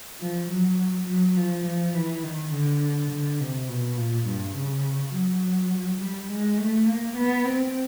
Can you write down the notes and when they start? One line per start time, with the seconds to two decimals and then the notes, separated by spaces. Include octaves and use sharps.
0.21 F3
0.49 F#3
1.07 F#3
1.37 F3
1.65 F3
1.94 E3
2.23 D#3
2.52 D3
3.11 D3
3.40 C3
3.69 B2
3.97 A#2
4.27 G2
4.56 C#3
5.13 F#3
6.00 G3
6.29 G#3
6.58 A3
6.87 A#3
7.16 B3
7.45 C4